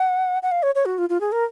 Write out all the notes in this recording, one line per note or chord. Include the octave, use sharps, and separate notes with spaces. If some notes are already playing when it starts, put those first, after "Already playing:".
Already playing: F#5
F#5
F5
C#5
C#5
F#4
F4
F4
G#4
A#4